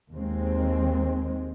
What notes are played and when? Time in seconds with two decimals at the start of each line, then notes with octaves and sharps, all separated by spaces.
0.13 D#2 D#3 G#3 C4